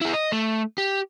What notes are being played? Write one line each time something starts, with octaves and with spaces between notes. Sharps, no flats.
E4 G#4
D#5
A3
G4